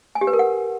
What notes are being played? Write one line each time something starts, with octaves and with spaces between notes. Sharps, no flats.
G#5
G4
B4
A#4
F#5